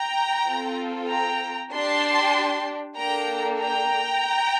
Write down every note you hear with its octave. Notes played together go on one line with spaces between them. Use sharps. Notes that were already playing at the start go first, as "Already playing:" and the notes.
Already playing: G5 A#5
C4 F4 A4
G5 A#5
D4 G4 A5 C6
A#3 D4 A4 G5 A#5
G5 A#5